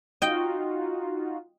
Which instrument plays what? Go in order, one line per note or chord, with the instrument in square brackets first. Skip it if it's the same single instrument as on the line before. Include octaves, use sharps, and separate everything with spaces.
[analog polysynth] D#4 F4 F#4 [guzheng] D#5 G5